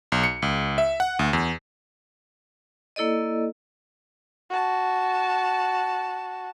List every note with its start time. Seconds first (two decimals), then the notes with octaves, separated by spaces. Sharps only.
0.12 B1
0.24 C#7
0.42 C#2
0.78 E5
1.00 F#5
1.19 D2
1.33 E2
2.96 A#3 E4 A4 D5 D#5
4.50 F#4 A5